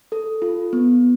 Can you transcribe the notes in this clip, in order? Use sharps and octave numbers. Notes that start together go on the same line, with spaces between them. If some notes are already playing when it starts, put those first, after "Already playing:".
A4
F4
B3